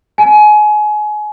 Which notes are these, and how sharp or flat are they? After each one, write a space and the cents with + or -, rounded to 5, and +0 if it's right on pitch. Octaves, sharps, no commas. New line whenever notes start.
G#5 +25